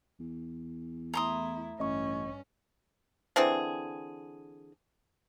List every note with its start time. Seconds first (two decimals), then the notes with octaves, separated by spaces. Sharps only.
0.20 E2
1.14 A3 E4 A#5 C6 D#6
1.80 A1 G2 C#4 D#5 C#6
3.36 D3 E3 C4 G#4